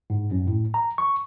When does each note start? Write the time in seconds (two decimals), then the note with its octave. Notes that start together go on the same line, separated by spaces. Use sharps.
0.10 G#2
0.31 F#2
0.47 A2
0.74 A#5
0.98 C#6